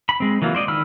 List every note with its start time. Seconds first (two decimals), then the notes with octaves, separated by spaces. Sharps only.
0.09 B5
0.20 G#3 C4
0.42 E3 F#3 A#3 F4
0.55 C5 D5 D#5
0.68 D#3 B5 E6 F6